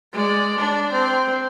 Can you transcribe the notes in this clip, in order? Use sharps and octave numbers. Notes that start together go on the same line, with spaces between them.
G#3 D5
D4
C4